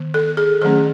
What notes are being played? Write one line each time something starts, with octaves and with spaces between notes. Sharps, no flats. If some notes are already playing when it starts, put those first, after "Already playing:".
Already playing: D#3 B3
A4
G#4
D#3 F#3 A3 C#4 G#4